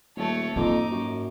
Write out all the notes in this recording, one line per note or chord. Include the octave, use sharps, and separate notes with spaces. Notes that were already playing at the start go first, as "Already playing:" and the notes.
D#1 A3 C#5
F2 G#2 A#3 D#4 D6
F#2